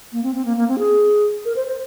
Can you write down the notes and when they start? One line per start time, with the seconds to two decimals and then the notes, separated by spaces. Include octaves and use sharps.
0.13 A#3
0.23 C4
0.35 C4
0.45 A#3
0.57 A#3
0.68 C4
0.79 G#4
1.45 A#4
1.56 C5
1.68 C5